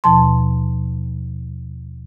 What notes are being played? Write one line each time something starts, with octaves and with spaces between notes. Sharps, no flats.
D#2 B2 F3 A5 C6